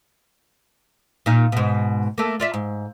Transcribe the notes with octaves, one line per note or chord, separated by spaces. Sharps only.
A#2 D#4
G#2 B2
A3 A#3
F4 D5 E5
G#2